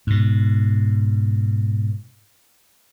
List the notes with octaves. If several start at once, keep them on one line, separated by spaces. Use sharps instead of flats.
G#2 B2